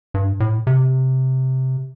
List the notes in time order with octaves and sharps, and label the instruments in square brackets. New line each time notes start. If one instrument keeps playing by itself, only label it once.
[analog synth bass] G2
A2
C3